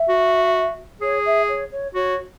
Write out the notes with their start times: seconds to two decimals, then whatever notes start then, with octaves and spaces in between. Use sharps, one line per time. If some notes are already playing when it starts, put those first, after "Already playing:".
Already playing: E5
0.09 F#4
1.01 G#4 C#5
1.25 E5
1.48 C#5
1.71 C#5
1.94 F#4 C#5